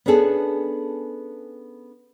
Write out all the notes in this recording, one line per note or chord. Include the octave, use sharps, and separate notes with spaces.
B3 C#4 D4 G#4 A4